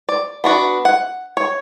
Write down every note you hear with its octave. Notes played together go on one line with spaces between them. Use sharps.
D5
B3 D4 F#4
F#5
C#5